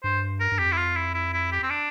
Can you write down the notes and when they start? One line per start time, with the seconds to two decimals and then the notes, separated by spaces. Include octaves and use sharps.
0.04 G2 C5
0.40 A#4
0.52 G2
0.59 F2 G4
0.72 E4
0.78 F4
0.96 E4
1.14 E4
1.34 E4
1.52 G4
1.63 C4
1.70 D4